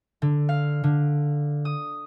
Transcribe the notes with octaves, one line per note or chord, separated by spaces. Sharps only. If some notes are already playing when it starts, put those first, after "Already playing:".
D3
F5
D3
D#6